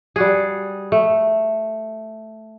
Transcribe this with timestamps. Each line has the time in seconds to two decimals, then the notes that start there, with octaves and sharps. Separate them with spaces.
0.16 G3 F#4 G#4
0.92 A3